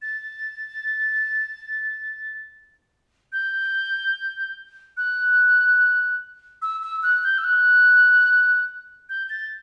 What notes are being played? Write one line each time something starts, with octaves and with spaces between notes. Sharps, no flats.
A6
G6
F#6
E6
E6
F#6
G6
E6
F#6
G6
A6